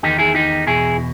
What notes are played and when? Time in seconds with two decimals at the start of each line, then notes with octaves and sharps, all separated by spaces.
0.03 E2 D#3 D#4 G4
0.19 E4 G#4
0.35 D#4 G4
0.67 E2 B2 E4 G#4